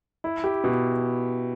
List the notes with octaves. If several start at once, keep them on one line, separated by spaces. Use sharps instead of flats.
E4
G4
B2